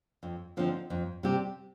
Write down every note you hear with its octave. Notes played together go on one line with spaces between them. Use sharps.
F2
D3 F3 C4 D#4
F2
C3 G3 C4 G4